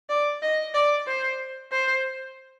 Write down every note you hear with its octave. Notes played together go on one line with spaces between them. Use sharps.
D5
D#5
D5
C5
C5